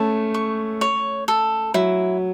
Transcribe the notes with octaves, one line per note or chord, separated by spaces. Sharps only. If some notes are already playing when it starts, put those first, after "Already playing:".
Already playing: A3 C#4 A5
C#6
C#5
A4
F#3 E4